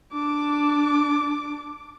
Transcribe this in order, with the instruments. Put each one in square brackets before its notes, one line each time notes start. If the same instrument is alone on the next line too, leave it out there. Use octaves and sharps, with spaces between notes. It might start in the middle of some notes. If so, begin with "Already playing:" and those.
[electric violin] D4 D6